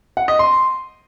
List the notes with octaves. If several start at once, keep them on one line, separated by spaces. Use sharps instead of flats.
F#5
D#5
C6